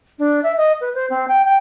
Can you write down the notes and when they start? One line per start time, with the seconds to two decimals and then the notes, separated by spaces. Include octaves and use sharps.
0.19 D4
0.43 E5
0.57 D#5
0.81 B4
0.95 C5
1.10 C4
1.28 G5
1.45 G5